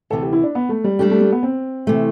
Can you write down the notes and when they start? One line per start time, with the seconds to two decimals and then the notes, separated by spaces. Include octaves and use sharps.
0.10 D2 C3 E3 A4
0.22 G4
0.33 E4
0.43 D4
0.55 B3
0.69 A3
0.84 G3
0.99 G3 A3 D4 G4
1.10 A3
1.21 A3
1.32 B3
1.43 C4
1.87 C3 E3 A3